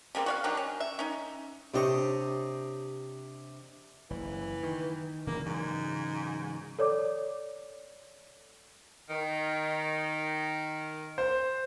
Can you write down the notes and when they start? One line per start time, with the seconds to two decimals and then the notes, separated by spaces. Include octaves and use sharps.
0.15 C#3 G3 A#3 C4
0.26 F#4 C#5 F5
0.44 D#3 F#3 D4 G4
0.57 C#4
0.80 E5
0.99 C#4 D#4
1.74 C3 D4 G4 C#5 D#5
4.10 F#1 E3
4.63 D#3
5.27 C#3 E3 F#3 A#3
5.46 G#2
6.79 A4 C#5 D5 D6
9.10 D#3
11.18 C5